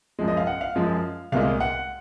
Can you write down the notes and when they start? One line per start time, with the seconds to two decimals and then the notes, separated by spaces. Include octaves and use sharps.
0.19 F#2 F3 G#3
0.28 D#5
0.37 F5
0.47 F#5
0.61 F5
0.75 F#2 F3 G#3
1.32 C2 A#2 G#3 F5
1.60 F#5